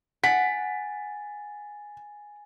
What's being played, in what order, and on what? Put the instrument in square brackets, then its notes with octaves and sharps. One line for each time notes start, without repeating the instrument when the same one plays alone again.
[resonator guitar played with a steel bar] F#5 [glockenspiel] G#5 A6 [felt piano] B6